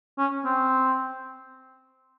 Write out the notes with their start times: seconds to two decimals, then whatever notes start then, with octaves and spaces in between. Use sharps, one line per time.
0.18 C#4
0.45 C4